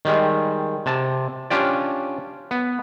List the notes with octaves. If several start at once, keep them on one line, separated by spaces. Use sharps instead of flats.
D#3 G3 G#3
C3 A5
C#4 D4 F4 G4 D5
B3